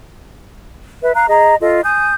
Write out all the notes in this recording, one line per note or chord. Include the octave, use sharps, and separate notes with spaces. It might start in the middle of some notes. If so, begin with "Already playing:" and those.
B4 E5
F5 A#5 F#6
G#4 D#5 A#5
F4 A4 D#5
G#5 D#6 G6